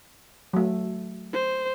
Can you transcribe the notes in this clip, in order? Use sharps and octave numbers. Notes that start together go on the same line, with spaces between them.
F#3 A3
C5